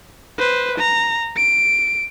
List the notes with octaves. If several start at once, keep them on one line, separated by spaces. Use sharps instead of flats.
B4 C5
A#5
D7